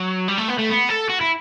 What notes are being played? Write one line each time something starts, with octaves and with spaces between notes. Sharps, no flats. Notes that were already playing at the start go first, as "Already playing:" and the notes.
Already playing: F#3
G3
A3
B3
A3
B3
A4
F#4
E4